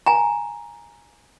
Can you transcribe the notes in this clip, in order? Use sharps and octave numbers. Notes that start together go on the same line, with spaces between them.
G#5 A#5